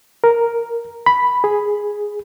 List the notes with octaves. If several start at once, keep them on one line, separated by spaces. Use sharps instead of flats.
A#4
B5
G#4